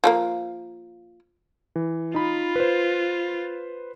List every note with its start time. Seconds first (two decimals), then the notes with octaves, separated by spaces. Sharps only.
0.04 F3 A3 A#3
1.76 E3
2.14 D#4 F4 B5
2.56 B4 C5